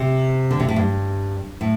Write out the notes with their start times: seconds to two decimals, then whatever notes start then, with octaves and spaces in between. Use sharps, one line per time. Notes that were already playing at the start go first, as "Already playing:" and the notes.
Already playing: C3
0.51 D3
0.60 C3
0.69 A2
0.76 G2
1.61 A2